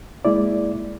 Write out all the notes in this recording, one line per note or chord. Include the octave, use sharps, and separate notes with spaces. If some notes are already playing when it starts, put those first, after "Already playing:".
G#3 A#3 E4 D5